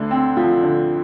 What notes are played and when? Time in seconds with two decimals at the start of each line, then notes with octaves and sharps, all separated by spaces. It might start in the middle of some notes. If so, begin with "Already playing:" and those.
Already playing: D2 D3
0.11 C4
0.37 F3
0.62 D3